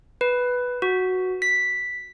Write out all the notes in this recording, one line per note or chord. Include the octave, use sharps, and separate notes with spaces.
B4
F#4
B6